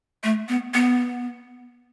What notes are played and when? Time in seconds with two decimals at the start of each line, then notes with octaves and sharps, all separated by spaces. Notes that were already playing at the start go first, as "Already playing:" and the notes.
0.24 A3
0.49 B3
0.74 B3